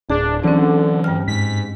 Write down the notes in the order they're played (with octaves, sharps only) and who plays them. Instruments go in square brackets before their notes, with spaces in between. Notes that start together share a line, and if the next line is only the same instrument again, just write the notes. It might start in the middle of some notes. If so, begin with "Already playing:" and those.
[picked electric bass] D1 [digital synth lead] D4 [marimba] G#4
[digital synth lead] D3 [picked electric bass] E3 F#3 [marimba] C4 C#4
[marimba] G2 G5 F6
[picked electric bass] G#2 [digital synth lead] B6